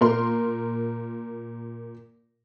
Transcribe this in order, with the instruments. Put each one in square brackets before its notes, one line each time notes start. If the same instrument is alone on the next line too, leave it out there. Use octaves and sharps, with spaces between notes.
[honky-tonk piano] A#2 A#4 C6